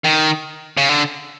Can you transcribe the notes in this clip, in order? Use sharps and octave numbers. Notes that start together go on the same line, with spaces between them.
D#3
C#3
D3